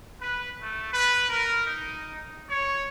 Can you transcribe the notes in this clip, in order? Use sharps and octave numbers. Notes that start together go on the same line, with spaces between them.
B4
A3
B4
A#4
D#4
C#5